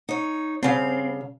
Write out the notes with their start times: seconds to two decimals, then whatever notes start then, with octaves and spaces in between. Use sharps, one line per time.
0.09 D#4 C#5
0.63 G2 C#3 C4 F5